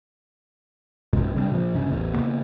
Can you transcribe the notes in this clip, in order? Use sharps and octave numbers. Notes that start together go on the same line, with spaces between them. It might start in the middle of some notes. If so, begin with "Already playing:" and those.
A#1 F#2 B2 G#3
C#3 G3 C4 D4
A#2 F3
G2 C#3 C#4
A1 E2
C#3 A#3 B3